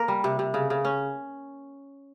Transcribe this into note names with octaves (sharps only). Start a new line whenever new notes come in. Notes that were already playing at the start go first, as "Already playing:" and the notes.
Already playing: A#3 A#4
G3
C3
C3
C#3
C#3
C#4